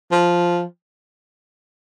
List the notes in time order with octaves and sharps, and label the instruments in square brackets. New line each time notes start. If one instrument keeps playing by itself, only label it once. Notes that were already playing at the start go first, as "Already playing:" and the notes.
[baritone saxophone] F3